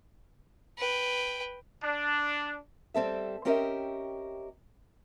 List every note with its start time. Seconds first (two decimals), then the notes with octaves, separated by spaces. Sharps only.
0.78 B4 G5
1.83 D4
2.94 G3 C4 A4 E5
3.45 C4 C#4 G4 A#4 D#5 E5